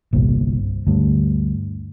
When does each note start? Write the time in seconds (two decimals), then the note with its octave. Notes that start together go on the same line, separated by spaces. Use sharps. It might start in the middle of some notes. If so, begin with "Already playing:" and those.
0.13 G1 C2 A#2
0.87 D2 G2